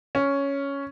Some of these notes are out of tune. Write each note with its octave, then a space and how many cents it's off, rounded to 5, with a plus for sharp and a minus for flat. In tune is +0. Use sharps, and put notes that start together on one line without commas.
C#4 +5